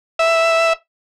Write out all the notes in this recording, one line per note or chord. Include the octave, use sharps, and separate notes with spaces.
E5